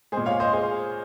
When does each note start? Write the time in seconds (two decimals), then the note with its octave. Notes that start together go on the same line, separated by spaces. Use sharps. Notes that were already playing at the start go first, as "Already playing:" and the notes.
0.12 G#3 G#4 C5
0.17 A#2
0.26 C#5 F5
0.40 C5 D#5
0.53 G#4 C5